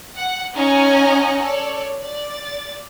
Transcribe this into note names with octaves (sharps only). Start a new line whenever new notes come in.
F#5
C#4 D#4 D#5 F#5 G#5 A#5
A4 C#5 D5
D5 A6